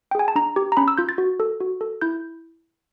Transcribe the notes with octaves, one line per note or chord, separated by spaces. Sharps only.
G5
G#4 G#5
A5
D4 A#5
G4
A#5
C#4 B5
E6
F4 G6
A6
F#4
A4
F#4
A4
E4 G6